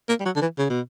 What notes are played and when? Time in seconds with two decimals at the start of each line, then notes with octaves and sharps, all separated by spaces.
0.09 A#3
0.20 G3
0.26 F#3
0.36 D3
0.42 E3
0.58 C#3
0.70 B2